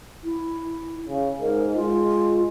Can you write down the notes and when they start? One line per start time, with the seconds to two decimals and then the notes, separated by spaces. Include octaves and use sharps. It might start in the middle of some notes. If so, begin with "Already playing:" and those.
0.24 E4
1.09 C#3
1.41 G#2 A#4
1.75 G#3 F4